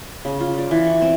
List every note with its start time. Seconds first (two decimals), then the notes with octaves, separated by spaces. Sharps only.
0.25 C#3
0.40 F4
0.58 D5
0.71 E3
0.87 C#6
1.01 C4